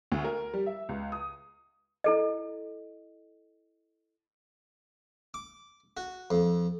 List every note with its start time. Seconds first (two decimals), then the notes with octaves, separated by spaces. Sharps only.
0.12 D2
0.24 A#4
0.53 G3
0.66 E5
0.89 C#2
1.12 D#6
2.04 E4 A4 D#5
5.34 D6
5.97 F#4
6.31 F2